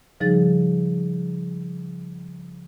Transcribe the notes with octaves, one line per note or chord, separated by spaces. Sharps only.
C#3 F3 G3 D#4 G#4 A6